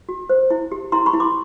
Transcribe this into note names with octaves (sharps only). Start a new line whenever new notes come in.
F#4
C5
E4
G4
E4 A#5 C6
B5 C#6
E4
C6 D6